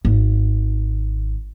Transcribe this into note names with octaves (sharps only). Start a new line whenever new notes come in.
G#1